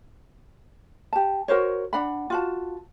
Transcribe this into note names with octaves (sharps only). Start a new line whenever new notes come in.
G4 A5
F#4 A#4 C5 C#5
D4 F#5 B5
F4 F#4 A5